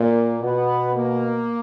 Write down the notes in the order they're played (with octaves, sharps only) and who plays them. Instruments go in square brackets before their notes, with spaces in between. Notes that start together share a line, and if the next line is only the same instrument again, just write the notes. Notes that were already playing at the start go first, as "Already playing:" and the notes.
Already playing: [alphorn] A#2 [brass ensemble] A#3
[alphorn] B2 [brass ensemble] B3
[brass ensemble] A#3